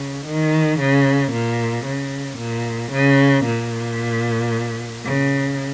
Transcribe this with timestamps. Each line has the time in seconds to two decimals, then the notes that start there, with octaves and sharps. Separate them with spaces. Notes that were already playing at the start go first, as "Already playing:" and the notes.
Already playing: C#3
0.26 D#3
0.79 C#3
1.33 A#2
1.86 C#3
2.38 A#2
2.92 C#3
3.45 A#2
5.05 C#3